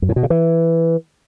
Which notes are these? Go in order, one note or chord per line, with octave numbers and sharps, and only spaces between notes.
F#2
A2
B2
C#3
E3